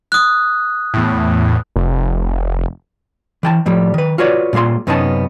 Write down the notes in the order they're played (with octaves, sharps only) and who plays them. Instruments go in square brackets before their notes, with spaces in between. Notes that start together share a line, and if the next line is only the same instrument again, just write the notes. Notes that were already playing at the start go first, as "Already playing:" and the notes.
[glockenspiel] D#6 F#6
[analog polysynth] E2 A2
[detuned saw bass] F1
[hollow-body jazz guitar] E3 G5 A5
A2 F3 G3
D#3 B4
F4 F#4 B4 C#5 D5
A#2 G3 F4 G#4 C6
F#2 C3 B3 C#4 D#4 A5